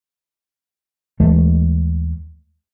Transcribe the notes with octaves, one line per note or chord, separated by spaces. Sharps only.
D#2 E3 G#3 A3